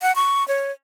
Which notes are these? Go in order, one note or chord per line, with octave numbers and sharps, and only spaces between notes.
F#5
C#6
C#5